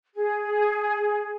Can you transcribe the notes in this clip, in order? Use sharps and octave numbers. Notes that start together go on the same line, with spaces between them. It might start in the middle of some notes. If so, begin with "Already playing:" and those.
G#4